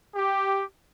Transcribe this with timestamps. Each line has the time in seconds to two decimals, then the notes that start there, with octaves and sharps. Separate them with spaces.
0.15 G4